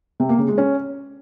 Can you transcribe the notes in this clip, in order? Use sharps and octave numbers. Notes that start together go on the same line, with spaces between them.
C3
A#3
C#3
G#3
C#4